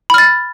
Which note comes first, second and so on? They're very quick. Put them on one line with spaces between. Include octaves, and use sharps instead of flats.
B5 F6 A6